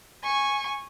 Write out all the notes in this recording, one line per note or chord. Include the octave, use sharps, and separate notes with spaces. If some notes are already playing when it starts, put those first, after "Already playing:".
G#5 C#6